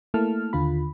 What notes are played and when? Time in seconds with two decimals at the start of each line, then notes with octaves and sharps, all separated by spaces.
0.14 A3 A#3 E4 A5 F6
0.53 D#2 D3 F4 B5